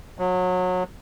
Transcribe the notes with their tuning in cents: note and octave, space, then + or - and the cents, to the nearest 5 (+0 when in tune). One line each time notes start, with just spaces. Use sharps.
F#3 -25